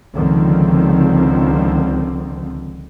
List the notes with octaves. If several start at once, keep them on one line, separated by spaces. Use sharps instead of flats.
C#2 D3 D#3 F3 C4